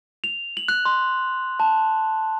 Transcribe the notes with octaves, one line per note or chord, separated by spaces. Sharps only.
F7
F#7
F#6
C6
A5